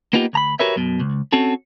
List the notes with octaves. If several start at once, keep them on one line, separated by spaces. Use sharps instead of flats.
A#3 B3 D#4 F4 G4
D2 A#5 B5
F#4 G4 A#4 B4 C#5 E5
B1 F#2 B2
C#2
C4 C#4 F#4 A4